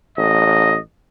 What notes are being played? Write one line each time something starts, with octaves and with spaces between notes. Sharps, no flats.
A1 D#5